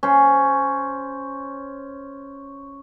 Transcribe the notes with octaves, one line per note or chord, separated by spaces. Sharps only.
C#4 C5